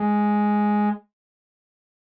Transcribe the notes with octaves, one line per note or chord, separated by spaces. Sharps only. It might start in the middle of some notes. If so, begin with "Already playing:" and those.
Already playing: G#3